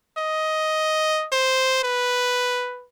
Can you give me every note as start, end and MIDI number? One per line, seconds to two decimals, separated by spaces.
0.18 1.27 75
1.32 1.82 72
1.84 2.85 71